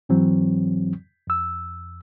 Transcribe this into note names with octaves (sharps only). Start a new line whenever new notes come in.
G#2 E3 F#3 C4
F2 E6